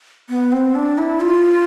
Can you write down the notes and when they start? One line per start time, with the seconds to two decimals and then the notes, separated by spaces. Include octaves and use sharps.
0.29 B3
0.52 C4
0.75 D4
0.98 E4
1.21 F4